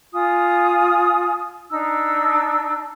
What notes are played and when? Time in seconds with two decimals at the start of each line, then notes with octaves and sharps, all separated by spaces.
0.13 F4 G#5 D#6
1.70 D4 D#4 E6